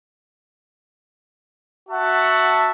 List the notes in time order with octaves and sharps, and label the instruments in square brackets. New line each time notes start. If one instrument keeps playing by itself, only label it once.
[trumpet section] F#4 E5 F#5 A5